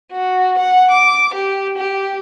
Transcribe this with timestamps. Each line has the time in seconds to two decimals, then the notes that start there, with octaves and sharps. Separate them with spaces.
0.12 F#4
0.58 F#5
0.90 D6
1.34 G4
1.77 G4